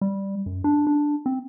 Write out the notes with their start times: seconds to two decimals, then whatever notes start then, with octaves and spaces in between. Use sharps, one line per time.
0.01 G3
0.46 F#2
0.64 D4
0.87 D4
1.26 C4